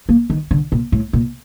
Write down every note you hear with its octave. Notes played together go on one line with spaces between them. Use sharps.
A#3
D#3
D3
A#2
A2
A#2